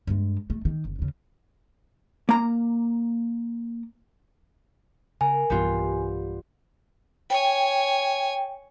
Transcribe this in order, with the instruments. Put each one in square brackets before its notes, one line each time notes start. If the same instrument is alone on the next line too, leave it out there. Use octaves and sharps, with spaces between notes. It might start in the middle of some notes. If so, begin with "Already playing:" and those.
[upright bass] G2 G#3
A3
D#3
F#1
D#2 C#3
[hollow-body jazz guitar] A#3 A#5
[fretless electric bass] C#3 [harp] A#4 [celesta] G#5
[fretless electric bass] B1 G2 E3 [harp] G3 B3 F4
[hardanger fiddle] C#5 G#5 [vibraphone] G5